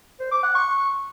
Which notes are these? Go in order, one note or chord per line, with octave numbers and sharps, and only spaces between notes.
C5
D6
F#5
C#6